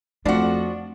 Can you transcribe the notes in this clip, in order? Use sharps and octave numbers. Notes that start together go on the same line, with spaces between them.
F2 F3 A3 D4 F#4